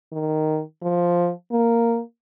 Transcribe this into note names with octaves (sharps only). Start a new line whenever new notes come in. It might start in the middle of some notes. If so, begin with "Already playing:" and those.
D#3
F3
A#3